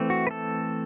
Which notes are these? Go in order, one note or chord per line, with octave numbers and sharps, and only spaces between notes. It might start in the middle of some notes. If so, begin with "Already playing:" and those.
Already playing: E3 A3 C4
F#4
B4
A4